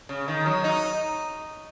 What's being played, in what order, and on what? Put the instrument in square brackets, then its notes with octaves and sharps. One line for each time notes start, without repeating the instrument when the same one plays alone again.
[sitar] C#3
D#3
F#3
D#4